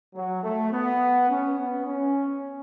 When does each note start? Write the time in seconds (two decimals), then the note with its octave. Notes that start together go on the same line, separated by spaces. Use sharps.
0.14 F#3
0.43 A3
0.71 B3
1.30 C#4
1.58 B3
1.87 C#4